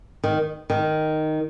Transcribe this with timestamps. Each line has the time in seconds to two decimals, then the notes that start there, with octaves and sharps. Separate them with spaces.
0.24 D#3
0.70 D#3